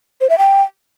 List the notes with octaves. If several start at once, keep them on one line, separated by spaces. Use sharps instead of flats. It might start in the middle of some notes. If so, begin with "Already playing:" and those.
C5
E5
G5